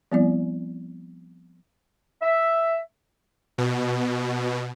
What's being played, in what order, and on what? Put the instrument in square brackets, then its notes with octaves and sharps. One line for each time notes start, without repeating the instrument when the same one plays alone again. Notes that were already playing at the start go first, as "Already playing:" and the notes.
[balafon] F3 G3 B3 C4 E4 D5
[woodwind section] E5
[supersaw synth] B2